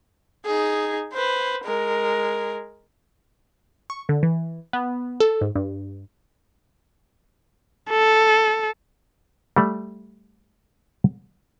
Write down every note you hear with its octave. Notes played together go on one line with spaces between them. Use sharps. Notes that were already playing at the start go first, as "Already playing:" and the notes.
D#4 G#4
B4 C5
G#3 A#4
C#6
D3
E3
B3
A4
G#2
G2
A4
G3 A3